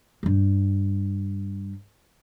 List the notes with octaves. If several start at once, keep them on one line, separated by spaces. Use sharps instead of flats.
G2 G3